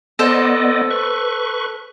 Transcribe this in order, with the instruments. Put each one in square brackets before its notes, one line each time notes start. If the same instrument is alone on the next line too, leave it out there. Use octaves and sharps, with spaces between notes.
[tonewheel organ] B3 D5 D#5 [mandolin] A4 C5
[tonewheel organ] B4 C#6